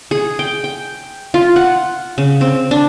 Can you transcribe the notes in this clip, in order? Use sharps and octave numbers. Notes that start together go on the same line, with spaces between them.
G#4
G5
G5
F4
F#5
C#3
C4
D4